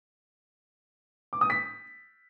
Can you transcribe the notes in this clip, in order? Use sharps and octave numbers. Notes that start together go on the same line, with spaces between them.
D6
D#6
B6